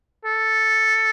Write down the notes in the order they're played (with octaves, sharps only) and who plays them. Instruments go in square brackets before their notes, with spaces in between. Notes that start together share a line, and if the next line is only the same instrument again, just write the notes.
[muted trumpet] A4